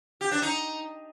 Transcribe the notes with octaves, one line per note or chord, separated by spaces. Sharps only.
G4
D4
D#4